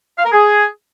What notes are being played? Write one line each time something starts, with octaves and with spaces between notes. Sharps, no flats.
F5
A#4
G#4